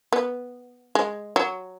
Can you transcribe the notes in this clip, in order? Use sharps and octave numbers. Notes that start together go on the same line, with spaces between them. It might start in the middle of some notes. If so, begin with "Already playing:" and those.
B3
G#3
F#3